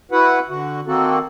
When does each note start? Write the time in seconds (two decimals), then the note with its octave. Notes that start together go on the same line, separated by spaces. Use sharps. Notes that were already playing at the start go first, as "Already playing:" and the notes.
0.11 E4 F#4 B4 F#5
0.49 D3 F#4
0.87 D#3 A#3 C4 F#4 A4